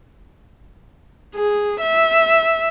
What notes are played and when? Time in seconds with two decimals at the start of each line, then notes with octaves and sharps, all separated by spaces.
1.35 G#4
1.81 E5